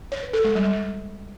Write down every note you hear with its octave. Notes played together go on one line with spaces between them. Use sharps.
C#5
B4
A4
G#3
G3